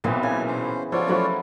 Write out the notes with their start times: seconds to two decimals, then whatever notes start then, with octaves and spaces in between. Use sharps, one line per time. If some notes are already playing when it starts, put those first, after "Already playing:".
0.04 B1 A#2 E3 B3 C4
0.23 C#3 G#5
0.47 C#4 C5
0.92 F3 F4 F#4 A4 C#5 D5
1.07 F3 F#3 A3 C#4 F#4 B5